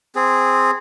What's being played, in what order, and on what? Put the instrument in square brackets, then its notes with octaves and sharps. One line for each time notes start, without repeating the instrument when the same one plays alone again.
[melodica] C4 G#4